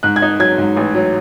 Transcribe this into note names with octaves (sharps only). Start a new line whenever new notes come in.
G#2 F#6
G#6
D#4
F#3 G#6
G#2
A1
F#3